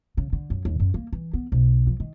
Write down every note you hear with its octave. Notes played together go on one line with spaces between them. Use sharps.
C#3
D3
F#2
D#2
F#2
A#3
E3
B3
B1
F3
D#3